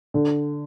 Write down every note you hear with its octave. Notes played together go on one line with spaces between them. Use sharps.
D3